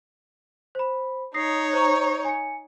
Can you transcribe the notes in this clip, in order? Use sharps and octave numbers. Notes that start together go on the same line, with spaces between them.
C5 B5
D#4 C#5 D#6 A#6 C7
C5 A#5 C#6
G#5 C#7